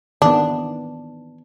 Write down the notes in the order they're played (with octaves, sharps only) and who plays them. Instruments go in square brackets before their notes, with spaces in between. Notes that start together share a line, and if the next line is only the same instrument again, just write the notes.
[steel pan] D#3 E3 B3 [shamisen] D4